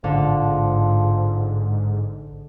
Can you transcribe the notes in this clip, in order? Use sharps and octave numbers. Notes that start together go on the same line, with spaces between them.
A1 G#2 D3 F3